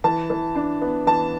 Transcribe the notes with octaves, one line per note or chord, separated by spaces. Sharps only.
E3 A5
E3
D4
B3
E3 A5